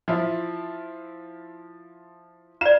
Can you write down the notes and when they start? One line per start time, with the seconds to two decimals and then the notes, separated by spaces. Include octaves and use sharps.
0.08 F3 E4 F4
2.61 F4 D5 F5 E7